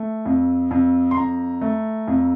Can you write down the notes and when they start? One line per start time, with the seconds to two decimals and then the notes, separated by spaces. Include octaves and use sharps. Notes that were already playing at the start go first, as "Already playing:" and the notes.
Already playing: A3
0.26 F2
0.71 F2
1.11 C6
1.16 F2 A#5
1.62 A3
2.08 F2